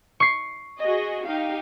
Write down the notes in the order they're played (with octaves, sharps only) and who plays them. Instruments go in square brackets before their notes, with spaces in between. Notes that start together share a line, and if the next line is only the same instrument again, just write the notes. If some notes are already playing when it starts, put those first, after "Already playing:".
[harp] C#6 C7
[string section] F#4 G#4 D#5
D#4 G4 F5